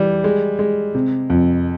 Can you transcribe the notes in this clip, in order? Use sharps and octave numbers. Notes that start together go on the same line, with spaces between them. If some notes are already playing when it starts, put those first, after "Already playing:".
Already playing: E3 G3
G#3
G#3
C3
F2